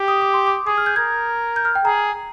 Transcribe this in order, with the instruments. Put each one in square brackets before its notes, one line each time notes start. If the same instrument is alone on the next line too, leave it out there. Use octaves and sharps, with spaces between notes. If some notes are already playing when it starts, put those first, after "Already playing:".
Already playing: [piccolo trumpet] G4
[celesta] D#6
D6
C6
D6
[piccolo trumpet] G#4 [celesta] D#6
[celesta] F6
G6
[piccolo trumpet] A#4 [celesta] G#6
[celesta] G6
F6
G5
[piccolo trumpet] G#4 [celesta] A#5